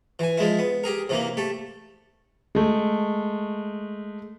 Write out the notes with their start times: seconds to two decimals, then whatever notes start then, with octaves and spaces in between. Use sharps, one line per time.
0.19 E3 G#5
0.38 F3 G#3 E4
0.59 B3
0.84 G4 G#4 A#4
1.09 C3 E3 A#3
1.37 A3 G4
2.55 G#3 A3